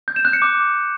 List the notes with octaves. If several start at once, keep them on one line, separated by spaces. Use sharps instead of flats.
G6
E7
F#6
C#7
D6